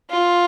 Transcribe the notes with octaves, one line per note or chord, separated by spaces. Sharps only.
F4